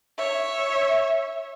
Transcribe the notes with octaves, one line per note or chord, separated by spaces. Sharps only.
C#5 E5